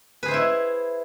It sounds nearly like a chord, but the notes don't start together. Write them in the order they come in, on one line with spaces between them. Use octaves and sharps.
B4 G#4 C5 E5 E4